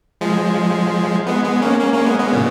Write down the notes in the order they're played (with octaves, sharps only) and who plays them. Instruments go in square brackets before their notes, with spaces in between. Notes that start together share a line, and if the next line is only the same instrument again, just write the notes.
[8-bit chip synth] F3 G#3
G#3 B3
G#3 B3
A#3 C#4
A#3 C#4
A#3 C#4
G#3 B3
G#3 B3
A#2 C#3